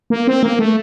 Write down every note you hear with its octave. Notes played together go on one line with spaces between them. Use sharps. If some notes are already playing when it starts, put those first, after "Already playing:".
A#3
C4
A#3
A3